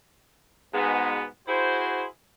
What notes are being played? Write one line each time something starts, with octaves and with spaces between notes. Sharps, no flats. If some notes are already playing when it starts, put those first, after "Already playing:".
G#2 B2 G#3 B3
E4 F#4 G#4 C5